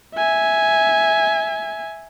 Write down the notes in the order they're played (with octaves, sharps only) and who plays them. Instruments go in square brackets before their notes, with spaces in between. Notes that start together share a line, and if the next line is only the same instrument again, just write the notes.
[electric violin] E5 G#5